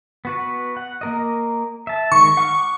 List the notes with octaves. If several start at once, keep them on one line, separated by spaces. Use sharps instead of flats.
B3 F#4 B4
F#5
A#3 A#4 D#5
E5 A5
D#3 G#3 C#6
F#5 D6 F6